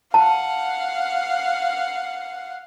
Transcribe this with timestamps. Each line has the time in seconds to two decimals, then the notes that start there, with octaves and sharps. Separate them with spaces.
0.14 F5 F#5 A5